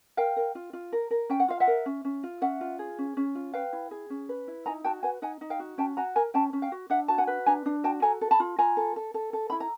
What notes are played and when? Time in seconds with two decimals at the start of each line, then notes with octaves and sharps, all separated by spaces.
0.17 A#4 F5 G5
0.36 A#4
0.55 F4
0.73 F4
0.92 A#4
1.11 A#4
1.29 C#4 G5
1.40 F#5
1.48 F4 F5
1.60 E5 F#5
1.67 A#4
1.86 C#4
2.05 C#4
2.23 F4
2.41 C#4 E5 F#5
2.61 F4
2.79 G#4
2.98 C#4
3.17 C#4
3.35 F4
3.54 B4 F5 G5
3.73 E4
3.91 G#4
4.10 C#4
4.29 B4
4.48 E4
4.66 D#4 G#5 A#5
4.84 F#4 G5 A5
5.03 B4 F#5 G#5
5.22 D#4 F#5 G#5
5.41 D#4
5.50 F5 G5
5.59 F#4
5.78 C#4 G5 A5
5.97 F#4 G#5 A#5
6.16 A#4 G#5 A#5
6.34 C#4 G5 A5
6.53 C#4
6.62 F5 G5
6.72 F#4
6.90 D4 E5 F#5
7.08 F#4 A5
7.18 F#5 G#5
7.27 B4
7.46 D4 G#5 A#5
7.66 D4
7.84 F#4 G5 A5
8.02 A4 G#5 A#5
8.21 A4
8.31 A5 B5
8.40 F4
8.58 F4 G#5 A#5
8.77 A4
8.96 A4
9.14 A4
9.33 A4
9.50 E4 B5
9.60 A#5